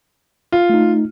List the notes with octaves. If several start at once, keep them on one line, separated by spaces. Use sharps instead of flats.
F4
A3 D#4